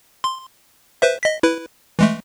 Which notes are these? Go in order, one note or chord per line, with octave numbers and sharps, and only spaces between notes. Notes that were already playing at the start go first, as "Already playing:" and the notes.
C6
B4 C5 E5
D#5 B6
E4 B4
E3 G#3 A3